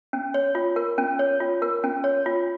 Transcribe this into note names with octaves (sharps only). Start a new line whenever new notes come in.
C#4
C#5
F4
A#4
C#4
C#5
F4
A#4
C#4
C#5
F4